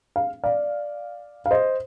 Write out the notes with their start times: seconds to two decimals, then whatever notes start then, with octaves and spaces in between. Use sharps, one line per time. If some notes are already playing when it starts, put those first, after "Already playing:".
0.16 F5
0.44 D5 F5
1.46 F5
1.51 C5 D#5